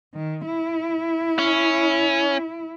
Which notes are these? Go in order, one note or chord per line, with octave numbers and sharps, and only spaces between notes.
D#3
E4
C#4